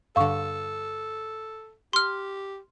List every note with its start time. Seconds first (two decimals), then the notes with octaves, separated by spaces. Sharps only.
0.16 G2 D3 A4 F5 C#6
1.93 G4 C6 F6